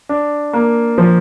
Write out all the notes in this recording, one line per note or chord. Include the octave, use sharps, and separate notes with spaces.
D4
A#3
F3